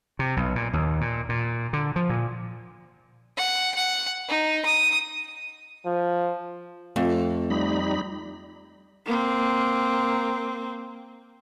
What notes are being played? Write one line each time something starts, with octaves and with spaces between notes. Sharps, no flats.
C3
B1
A#2
D#2
A#2
A#2
D3
F3
A#2
F#5
F#5
D#4
D#6
F3
F2 A3
G3 D#4 B5
A#3 C4